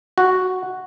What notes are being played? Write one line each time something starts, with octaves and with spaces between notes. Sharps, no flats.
F#4